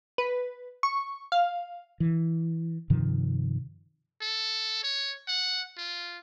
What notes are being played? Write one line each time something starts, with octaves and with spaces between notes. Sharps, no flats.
B4
C#6
F5
E3
G2 C3 D#3 F3
A4
C#5
F#5
F4